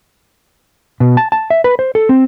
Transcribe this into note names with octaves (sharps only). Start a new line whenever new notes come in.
B2
A5
A5
E5
B4
C5
A4
C4